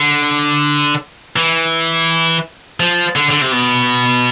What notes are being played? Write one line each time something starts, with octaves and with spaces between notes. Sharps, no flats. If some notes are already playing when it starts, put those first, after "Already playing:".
Already playing: D3
E3
F3
D3
D3
C3
B2